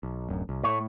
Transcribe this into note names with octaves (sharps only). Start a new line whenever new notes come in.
B1
D1 F#2
C2
A2 A3 C#5